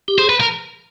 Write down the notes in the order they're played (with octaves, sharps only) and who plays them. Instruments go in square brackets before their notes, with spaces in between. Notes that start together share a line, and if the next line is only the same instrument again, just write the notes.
[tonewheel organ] G4
[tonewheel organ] G#4 [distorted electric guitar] C5
[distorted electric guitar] B4
A#4